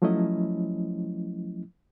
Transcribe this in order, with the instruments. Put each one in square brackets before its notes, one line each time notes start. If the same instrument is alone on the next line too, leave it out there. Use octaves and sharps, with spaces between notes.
[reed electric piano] F3 F#3 A3 C#4 E4 D#5